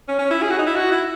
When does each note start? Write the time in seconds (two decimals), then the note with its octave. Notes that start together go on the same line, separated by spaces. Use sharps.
0.08 C#4
0.19 C#4
0.31 E4
0.42 G#4
0.50 F#4
0.58 D#4
0.66 E4
0.76 F#4
0.92 E4